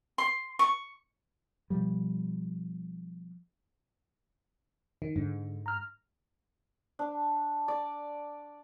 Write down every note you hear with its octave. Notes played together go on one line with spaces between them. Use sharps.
C6
C#6
B2 F3 G3
D#3
G#2 D3
A#5 F6
D4
D5